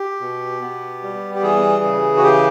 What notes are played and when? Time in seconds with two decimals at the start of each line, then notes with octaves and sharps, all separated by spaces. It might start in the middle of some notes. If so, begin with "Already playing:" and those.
Already playing: G4
0.21 B2
0.61 B3
1.03 G3
1.35 G4
1.43 E3 G#4
1.83 C#3
2.17 F#4
2.24 E3 G4